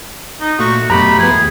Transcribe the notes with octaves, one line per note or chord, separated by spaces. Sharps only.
D#4
A#2 A3 F#4 C#6
F#2 B2 A3 G4 A#5 B5
F3 B3 G#4
D#2